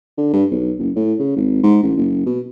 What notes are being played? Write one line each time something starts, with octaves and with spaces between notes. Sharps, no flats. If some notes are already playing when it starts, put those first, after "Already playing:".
D3
G2
B1
F#1
A2
C#3
G#1
G#2
A1
F#1
B2